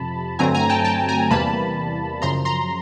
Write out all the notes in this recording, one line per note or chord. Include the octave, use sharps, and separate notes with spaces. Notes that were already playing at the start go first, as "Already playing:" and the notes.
Already playing: F2 C3 F3 A5 B5
G2 D3 F#3 A3 C4 G#5 A#5
G#5 A#5
G5 A5
G5 A5
G#5 A#5
E2 C3 E3 G3 A#3 A5 B5
F#2 C#3 F3 A#5 C6
A#5 C6